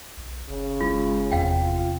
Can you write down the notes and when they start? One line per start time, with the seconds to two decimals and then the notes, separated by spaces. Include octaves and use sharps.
0.17 B1
0.49 F#1 C#3
0.80 G#3 F4
1.32 E2 C3 F5 G5
1.63 F4